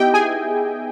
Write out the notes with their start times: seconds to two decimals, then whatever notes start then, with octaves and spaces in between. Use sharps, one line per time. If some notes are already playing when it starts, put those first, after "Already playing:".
Already playing: B3 D#4 E4 G4 D#5 E5 G5
0.14 G#4 G#5